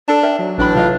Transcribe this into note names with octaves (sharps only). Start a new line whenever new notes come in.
D4 A4 A5
A#4 E5 G5
F#3
A1 A2 E3 D4 B5
C3 F#3 F4 D#5